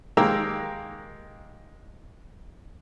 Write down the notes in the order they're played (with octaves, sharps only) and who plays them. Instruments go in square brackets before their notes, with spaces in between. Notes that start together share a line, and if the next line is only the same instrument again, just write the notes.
[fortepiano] D#3 G#3 A#3 G4 A#5 E6